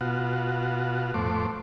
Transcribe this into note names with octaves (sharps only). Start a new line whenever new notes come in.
B2 F4 F#4
F2 A2 A3 C5 D6